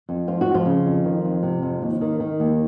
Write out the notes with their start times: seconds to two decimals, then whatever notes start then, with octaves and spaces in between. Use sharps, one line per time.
0.09 F2
0.28 F3 F4
0.41 F#4
0.47 F2
0.54 F3 F4
0.66 C#3
0.86 F2
1.05 D#3
1.25 F2
1.43 C3
1.62 F2
1.82 D#2
2.01 D#3
2.20 D#3
2.40 D#2